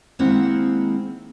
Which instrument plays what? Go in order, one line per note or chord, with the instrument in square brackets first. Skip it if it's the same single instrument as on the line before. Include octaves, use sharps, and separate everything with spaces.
[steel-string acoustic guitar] D#3 G#3 A#3 C4 E4 F#5